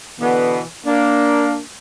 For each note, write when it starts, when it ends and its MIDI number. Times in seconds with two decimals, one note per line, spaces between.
0.20 0.60 47
0.20 0.60 50
0.20 0.60 52
0.20 0.60 59
0.85 1.60 58
0.85 1.60 62